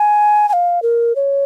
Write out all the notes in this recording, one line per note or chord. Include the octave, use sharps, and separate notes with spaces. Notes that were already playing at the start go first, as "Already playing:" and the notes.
Already playing: G#5
G#5
F5
A#4
C#5